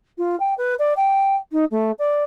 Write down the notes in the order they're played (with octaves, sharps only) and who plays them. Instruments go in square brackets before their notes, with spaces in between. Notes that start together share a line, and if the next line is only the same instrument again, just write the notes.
[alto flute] F4
G5
B4
D5
G5
D#4
A3
D5